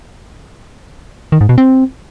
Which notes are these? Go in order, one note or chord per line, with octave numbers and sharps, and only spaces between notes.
D#3
G#2
B2
C4